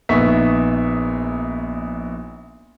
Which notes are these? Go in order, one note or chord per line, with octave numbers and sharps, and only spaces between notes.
A#1 B3 D#4 E5 C#6 B6